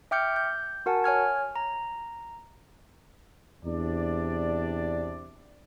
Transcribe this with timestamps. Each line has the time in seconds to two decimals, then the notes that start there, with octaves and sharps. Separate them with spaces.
0.11 E5 G5 D6 F6 G6 C#7
0.36 G6
0.86 F#4 A#4 F#5 G#5 A5
1.04 C#5 G#5 F6 G#6
1.56 A#5
3.64 E2 C3 D4 D5